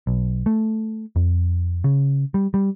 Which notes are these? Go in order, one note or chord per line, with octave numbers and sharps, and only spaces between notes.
B1
A3
F2
C#3
G3
G3